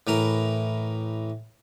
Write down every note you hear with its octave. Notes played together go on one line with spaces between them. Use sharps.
A2 E3 A#4 A#5